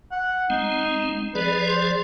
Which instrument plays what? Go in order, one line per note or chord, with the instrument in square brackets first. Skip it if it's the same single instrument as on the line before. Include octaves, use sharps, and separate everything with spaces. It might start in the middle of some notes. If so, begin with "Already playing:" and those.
[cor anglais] F#5
[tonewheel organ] G#3 C4 [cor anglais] D#4
[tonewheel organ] F3 G#4 D5 [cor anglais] B4
[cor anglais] C5